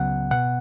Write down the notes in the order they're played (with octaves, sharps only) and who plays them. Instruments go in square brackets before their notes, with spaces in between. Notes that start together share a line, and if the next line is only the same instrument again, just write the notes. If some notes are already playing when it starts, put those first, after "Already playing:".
Already playing: [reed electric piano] C#2 C#3 F#3 B3 F#5
B2 B3 F#5